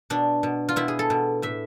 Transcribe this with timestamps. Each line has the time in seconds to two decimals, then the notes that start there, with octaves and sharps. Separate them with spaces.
0.10 B2 D4
0.43 B2
0.69 F4
0.76 B2 E4
0.88 G#4
0.99 A4
1.10 B2
1.42 A2 E5